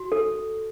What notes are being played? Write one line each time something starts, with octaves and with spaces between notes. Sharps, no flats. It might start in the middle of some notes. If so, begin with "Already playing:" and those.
Already playing: F#4
A4